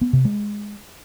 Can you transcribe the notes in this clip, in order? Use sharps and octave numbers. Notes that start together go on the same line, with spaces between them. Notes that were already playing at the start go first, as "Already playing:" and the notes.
B3
C3
G#3